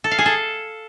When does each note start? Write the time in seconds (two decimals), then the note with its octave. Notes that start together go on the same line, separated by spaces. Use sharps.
0.04 A4
0.11 F5
0.19 G#4
0.26 A4